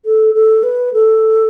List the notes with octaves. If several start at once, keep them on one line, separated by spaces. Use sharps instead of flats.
A4
A4
B4
A4